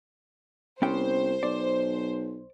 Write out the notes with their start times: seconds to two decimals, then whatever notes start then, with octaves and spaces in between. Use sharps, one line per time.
0.82 C2 B3 C#4 C5 G5
1.43 B1 D5